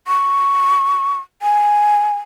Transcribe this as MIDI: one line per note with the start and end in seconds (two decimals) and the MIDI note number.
0.08 1.19 85
1.42 2.16 80